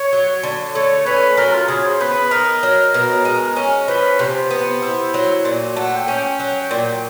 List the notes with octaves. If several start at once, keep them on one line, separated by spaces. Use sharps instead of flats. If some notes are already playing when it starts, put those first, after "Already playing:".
Already playing: C#5
F#3
D3
A3 C#5
C#4 B4
F#3 A#4
F4
C#3 G#4
C5
B3 B4
D#4 A#4
F#3
B2
G#3
C#4
F3 B4
C3 C5
B3
E4
F#3
A#2
A3 F#5
G5
C#4
G5
F#3
A#2